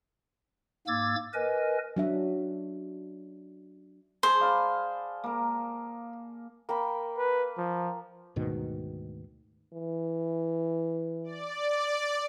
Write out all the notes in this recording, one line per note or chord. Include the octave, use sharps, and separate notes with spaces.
G#2 A#3 D6 E6 G#6 A6
A#4 B4 D#5 G#5
F#3 D4 E5
G#4 C5 A5
D5 F5 B5
A#3 A#4
A#3 G5 B5
B4
F3
D2 G#2 B2 D#3
E3
D5